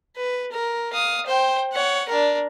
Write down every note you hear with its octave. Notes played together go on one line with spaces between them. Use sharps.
B4
A#4
F5 D#6
C5 G5
C#5 F#5
D4 A#4